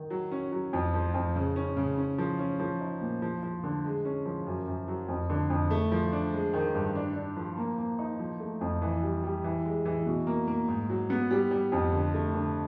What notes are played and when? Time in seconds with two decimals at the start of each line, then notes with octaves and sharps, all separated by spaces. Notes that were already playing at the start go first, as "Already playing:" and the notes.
Already playing: D#3
0.10 F#3
0.32 C#4
0.52 F#3
0.73 F2
0.94 F3
1.14 F2
1.36 C#3
1.56 C#4
1.77 C#3
1.98 C#4
2.18 F3
2.39 C#4
2.60 F3
2.81 D#4
3.01 A#2
3.22 F3
3.43 F3
3.64 D3
3.84 G#3
4.05 C#4
4.26 F3
4.46 F#2
4.67 F#2
4.88 F#3
5.09 F2
5.30 D3
5.50 F2
5.71 A3
5.92 F3
6.12 D4
6.33 G#3
6.53 D#3
6.74 G2
6.95 D4
7.16 D4
7.37 F3
7.57 A#3
7.78 A#3
7.99 D#4
8.19 F3
8.40 A3
8.61 F2
8.82 E3
9.03 G3
9.24 G3
9.44 E3
9.65 G#3
9.85 E3
10.06 B2
10.27 A#3
10.47 A#3
10.68 G#2
10.90 F#3
11.10 B3
11.31 G3
11.51 G3
11.72 F2
11.93 D3
12.14 A3
12.34 D3